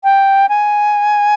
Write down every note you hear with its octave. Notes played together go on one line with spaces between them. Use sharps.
G5
G#5